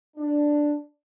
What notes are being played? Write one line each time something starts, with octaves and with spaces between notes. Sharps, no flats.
D4